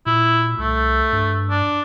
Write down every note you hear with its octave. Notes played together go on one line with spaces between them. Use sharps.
A#2 E4
C2 A3
G2
D4